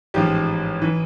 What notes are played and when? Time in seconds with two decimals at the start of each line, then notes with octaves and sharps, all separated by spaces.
0.14 A1 G#2 F3 G4
0.82 E3